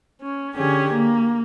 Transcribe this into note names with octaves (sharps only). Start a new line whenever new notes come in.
C#4
D3 C#4 G4 G#4
A#3